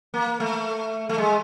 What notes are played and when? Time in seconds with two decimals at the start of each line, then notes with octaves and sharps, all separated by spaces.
0.14 A#3
0.40 A3
1.09 A3
1.18 G#3